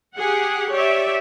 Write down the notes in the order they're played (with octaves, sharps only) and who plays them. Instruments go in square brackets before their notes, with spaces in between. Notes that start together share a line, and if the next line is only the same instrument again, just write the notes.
[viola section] G4 G#4 F#5
G4 C#5 D5 E5